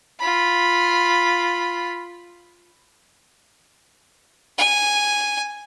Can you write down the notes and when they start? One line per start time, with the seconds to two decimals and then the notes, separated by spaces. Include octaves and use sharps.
0.20 F4 B5
4.58 G#5